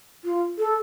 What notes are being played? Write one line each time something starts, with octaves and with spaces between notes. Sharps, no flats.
F4
A4